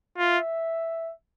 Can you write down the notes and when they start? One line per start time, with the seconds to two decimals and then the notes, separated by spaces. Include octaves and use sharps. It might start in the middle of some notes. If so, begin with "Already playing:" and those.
0.18 F4 E5